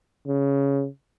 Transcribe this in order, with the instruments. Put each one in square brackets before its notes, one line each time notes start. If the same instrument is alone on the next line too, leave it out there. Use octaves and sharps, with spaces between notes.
[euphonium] C#3